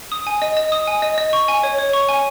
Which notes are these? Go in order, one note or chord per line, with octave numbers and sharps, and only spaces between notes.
D#6
G#5
D#5
D#5
D#6
G#5
D#5
D#5
C#6
G#5
C#5
C#5
C#6
G#5